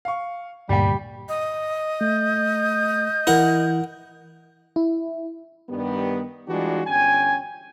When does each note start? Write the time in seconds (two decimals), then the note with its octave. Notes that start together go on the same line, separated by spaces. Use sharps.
0.05 F5 C#6
0.69 D2 G2 A#2 G3 G4 G5
1.29 D#5
2.01 A3 G6
3.27 E3 E4 A#4 F#5
4.76 E4
5.70 G2 D#3 G3 B3
6.48 E3 G3 G#3 D4 F4 F#4
6.87 G1 C#4 G5 G#5